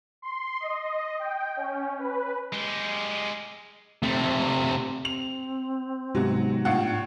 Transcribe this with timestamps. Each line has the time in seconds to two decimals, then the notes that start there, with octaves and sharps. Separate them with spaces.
0.22 C6
0.60 D#5
1.19 G5
1.57 C#4
1.99 B4
2.53 G#3 G4
4.03 C3 A3
5.05 C4 F7
6.15 G#2 C3 F#3 B3 F#4
6.65 A2 D4 F4 F#5